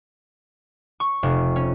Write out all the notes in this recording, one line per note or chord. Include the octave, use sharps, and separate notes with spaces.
C#6
F1
C#4